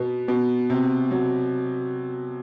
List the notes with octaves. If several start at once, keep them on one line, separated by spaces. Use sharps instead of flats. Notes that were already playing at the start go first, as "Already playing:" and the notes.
Already playing: B2 B3
B2
C3
F#3